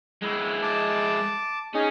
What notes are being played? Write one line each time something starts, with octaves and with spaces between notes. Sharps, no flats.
G#3 E4
A5 D6
C#4 D#4 G#4